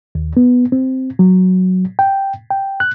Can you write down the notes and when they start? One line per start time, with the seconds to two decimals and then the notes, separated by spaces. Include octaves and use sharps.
0.15 D#2
0.37 B3
0.72 C4
1.19 F#3
1.99 G5
2.51 G5
2.80 F#6